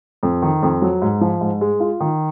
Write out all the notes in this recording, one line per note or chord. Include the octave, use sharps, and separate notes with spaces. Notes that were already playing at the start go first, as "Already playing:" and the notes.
F2
D#3
F2
F#3
G#2
F3
G#2
G#3
F4
D#3